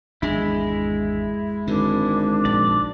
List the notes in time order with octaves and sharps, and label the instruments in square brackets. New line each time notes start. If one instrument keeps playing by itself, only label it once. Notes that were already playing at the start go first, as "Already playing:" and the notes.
[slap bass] G#1 E2 D4 [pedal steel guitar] G#3 E4
[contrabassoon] G#1 [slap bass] F#2 D3 [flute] D4
[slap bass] A#1 [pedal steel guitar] D5